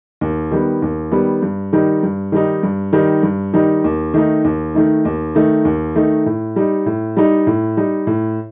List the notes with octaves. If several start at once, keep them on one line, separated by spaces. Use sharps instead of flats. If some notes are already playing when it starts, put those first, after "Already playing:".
D#2
D#3 G3 B3
D#2
D#3 G3 B3
G2
D#3 G3 D#4
G2
D#3 G3 D#4
G2
D#3 G3 D#4
G2
D#3 G3 D#4
D#2
D#3 A3 D#4
D#2
D#3 A3 D#4
D#2
D#3 A3 D#4
D#2
D#3 A3 D#4
A2
G3 D#4
A2
G3 D#4
A2
G3 D#4
A2